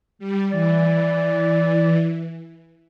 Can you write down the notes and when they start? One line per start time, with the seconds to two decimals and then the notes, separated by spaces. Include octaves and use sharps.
0.19 G3
0.51 E3 D5